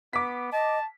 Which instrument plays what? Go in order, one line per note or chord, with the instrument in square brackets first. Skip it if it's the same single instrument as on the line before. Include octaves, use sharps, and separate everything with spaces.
[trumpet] B3 [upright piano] D6 B6
[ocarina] D#5 [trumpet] A5